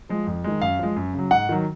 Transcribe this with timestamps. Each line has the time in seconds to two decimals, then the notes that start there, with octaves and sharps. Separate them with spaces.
0.09 F3 G#3
0.27 F2
0.44 D#3 G#3
0.62 F#2 F5
0.79 F3 G#3
0.96 F#2
1.14 C#3 F#3
1.31 G#2 F#5
1.49 D#3 F#3